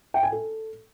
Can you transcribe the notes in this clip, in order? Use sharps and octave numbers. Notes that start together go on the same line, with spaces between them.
G5
G#5
A4